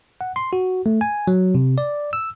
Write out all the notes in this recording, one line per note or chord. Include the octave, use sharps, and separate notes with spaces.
F#5
C6
F#4
A3
G#5
F#3
C3
D5
E6